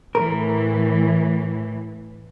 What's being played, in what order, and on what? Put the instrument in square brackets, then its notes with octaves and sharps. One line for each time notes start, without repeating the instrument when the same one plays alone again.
[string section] A2 E3 [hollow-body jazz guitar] A#4